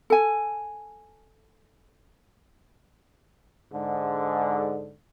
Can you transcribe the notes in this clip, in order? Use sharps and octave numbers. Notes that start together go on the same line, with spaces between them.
A4 G#5
G#2 D3